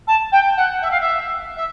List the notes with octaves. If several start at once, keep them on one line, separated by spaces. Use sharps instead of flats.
A5
G5
F#5
E5
F5
E5
E5